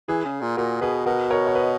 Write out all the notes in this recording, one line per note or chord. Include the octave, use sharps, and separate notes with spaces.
E3 G#4
C#3
A#2
A#2 F#4 A#4
B2 G#4 B4
B2 F#4 A#4
A#4 C#5
C#5
B4 D#5